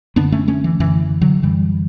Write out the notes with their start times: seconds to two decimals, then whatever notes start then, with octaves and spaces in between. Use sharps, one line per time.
0.16 F#2 D3 B3 D4
0.32 A3 C#4
0.48 A3 C#4
0.64 E3
0.80 F#2 D3 E3
1.21 D3 F#3
1.42 F#2 D3 E3 G3